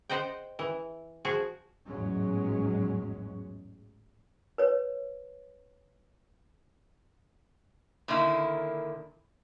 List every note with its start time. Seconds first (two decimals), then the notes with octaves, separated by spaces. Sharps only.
0.09 C5 D#5 F#5 G5
0.59 E3
1.25 F3 F#4 G#4
1.85 A1 E2 G#2 F#3 G#3 C#4
4.58 B4 C#5
8.08 A#2 D3 D#3 A#3 E4